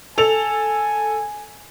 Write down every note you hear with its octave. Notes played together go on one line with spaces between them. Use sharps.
A4 G#5 F7